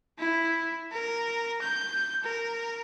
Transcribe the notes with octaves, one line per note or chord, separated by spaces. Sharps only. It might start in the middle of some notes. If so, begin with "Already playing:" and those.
E4
A#4
G6
A#4